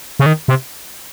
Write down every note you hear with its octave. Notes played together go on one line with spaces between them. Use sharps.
C#3
D#3
C3